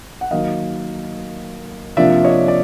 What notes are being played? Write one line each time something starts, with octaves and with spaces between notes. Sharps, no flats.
F#5
D#3 F#3 A#3 D#5 F5
C3 F3 A#3 D4 F4 D5 E5
C#5 D#5
D5